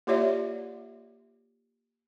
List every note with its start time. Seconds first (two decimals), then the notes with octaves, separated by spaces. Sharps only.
0.07 A#3 F4 G4 C#5 D5 E5